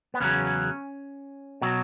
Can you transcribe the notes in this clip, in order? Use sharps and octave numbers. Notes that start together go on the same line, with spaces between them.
B3
E2 C#3 F#3 C#4
B2 F#3